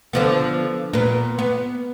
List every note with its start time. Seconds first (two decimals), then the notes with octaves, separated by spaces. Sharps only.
0.13 D3 F3 B3
0.93 A#2 B3
1.39 B3